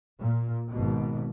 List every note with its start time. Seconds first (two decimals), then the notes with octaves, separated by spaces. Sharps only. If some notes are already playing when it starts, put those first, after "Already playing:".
0.21 A#2
0.71 G#1 B2